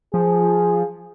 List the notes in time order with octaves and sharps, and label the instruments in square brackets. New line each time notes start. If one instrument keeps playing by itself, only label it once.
[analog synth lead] F3 [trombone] G#4